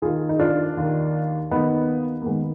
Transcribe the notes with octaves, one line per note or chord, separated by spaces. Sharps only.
D#2 D#3 F4 G#4
D#4
D4 F4
D#2 D#3
D#2 D#3 B3 D#4
A#3
D#2 D#3 G#3 B3